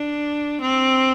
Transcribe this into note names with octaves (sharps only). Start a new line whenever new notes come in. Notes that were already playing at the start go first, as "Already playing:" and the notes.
Already playing: D4
C4